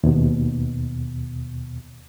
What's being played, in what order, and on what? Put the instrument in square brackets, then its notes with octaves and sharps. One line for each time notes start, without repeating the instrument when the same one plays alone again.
[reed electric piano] D#2 B2